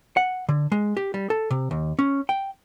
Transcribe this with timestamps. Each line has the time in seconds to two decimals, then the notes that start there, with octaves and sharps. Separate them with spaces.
0.17 F#5
0.49 D3
0.72 G#3
0.97 G4
1.14 G3
1.30 A4
1.51 C3
1.71 D#2
1.99 C#4
2.29 G5